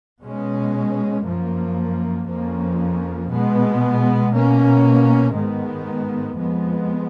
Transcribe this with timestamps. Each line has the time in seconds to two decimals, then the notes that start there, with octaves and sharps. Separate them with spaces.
0.22 B2 G#3 C#4
1.25 F#2 F3 A#3
2.27 F2 F3 A#3 C#4
3.30 B2 G#3 B3
4.32 B2 A#3 C#4
5.35 G#2 D#3 G#3 B3
6.37 F2 F3 G#3 B3